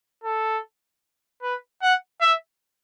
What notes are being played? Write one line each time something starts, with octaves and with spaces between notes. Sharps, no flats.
A4
B4
F#5
E5